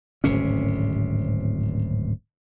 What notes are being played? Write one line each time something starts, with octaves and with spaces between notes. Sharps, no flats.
D1 G#1 C3 C#4